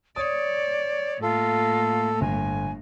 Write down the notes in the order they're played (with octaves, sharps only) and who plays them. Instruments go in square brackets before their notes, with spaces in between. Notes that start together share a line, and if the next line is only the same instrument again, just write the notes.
[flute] C#5 [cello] D5 [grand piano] D#6
[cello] A2 A#3 [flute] F4 [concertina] A4
[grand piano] G1 [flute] G#5